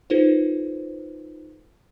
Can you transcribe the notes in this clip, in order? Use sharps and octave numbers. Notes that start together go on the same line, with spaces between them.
D#4 F4 A4 B4 C5